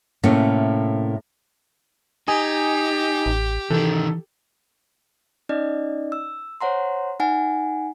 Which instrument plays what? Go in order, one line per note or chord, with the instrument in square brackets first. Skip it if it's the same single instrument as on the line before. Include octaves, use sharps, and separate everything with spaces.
[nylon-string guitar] A2 C3 A3 A#3 C#4
[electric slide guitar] D#4 [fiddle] G4 [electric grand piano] G#5 D#6
[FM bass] A1
[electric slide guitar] C3 D#3 [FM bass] E3 [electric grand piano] A4
[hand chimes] C#4 D#4 D5 D#5
E6
C5 C#5 F#5 A#5 C6
D#4 F#5 G#5